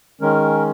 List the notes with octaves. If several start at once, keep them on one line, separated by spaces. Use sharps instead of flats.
D#3 G#3 C#4 A#4